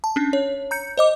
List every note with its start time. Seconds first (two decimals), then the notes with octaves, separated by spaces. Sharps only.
0.04 A5
0.16 C#4 D4
0.33 C#5
0.71 A#5 G6 C#7
0.98 C5 D#5 D6